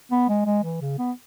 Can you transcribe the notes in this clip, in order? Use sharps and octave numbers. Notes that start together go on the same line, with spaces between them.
B3
G#3
G#3
E3
C#3
B3